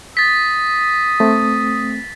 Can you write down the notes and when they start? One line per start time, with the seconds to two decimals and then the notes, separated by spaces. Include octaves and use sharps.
0.17 D#6 A6 B6
1.20 A3 C4